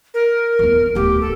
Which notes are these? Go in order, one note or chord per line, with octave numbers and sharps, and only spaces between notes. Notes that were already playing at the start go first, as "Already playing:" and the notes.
A#4
E2 B3
D1 B3 G4
A4